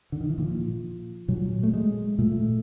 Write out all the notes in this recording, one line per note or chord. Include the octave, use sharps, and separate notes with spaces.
D3
D#3
E3
A#2 F3
A#2 F#3
A3
G#3
A#2 A3